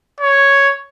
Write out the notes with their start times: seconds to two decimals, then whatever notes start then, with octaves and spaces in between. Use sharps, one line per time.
0.20 C#5